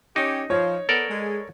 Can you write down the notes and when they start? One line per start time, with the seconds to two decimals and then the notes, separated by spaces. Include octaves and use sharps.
0.16 C#4 D#4 G4
0.50 F3 C#5
0.89 B3 A4 A#4 D5
1.10 G#3